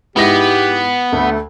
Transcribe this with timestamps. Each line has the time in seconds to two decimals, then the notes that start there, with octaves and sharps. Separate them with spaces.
0.16 G#2 B3 E4 G4 A#6
1.12 D2 A3